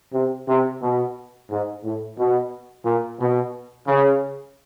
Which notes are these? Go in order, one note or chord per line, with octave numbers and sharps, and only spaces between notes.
C3
C3
B2
G#2
A2
B2
A#2
B2
C#3